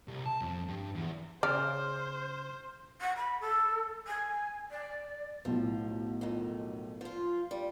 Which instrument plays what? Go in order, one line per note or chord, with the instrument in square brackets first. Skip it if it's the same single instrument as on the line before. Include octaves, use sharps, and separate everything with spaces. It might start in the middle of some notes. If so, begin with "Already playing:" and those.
[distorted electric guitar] C2
A5
F2
G2
E2
[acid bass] C#3 [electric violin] C5 [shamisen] D5 [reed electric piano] F6
[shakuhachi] F#5
B5
A4
G#5
D5
[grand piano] B1 A2 [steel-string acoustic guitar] F3
[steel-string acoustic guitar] F2 D#3
F3 F4
G3